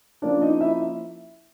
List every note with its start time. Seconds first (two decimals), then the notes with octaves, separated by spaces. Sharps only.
0.22 F3 A#3 C#4 D4 D5
0.42 D#4 D#5
0.61 E4 E5